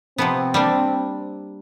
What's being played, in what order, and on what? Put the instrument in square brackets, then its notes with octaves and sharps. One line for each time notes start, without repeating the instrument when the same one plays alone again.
[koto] C3 F3 B3 [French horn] C4
[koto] G3 A#3 D4